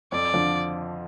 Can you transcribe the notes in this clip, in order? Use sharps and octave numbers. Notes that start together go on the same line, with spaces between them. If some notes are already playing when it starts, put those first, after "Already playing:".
F2 D5
D3 F3